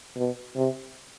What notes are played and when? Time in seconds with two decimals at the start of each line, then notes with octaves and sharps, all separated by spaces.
0.16 B2
0.55 C3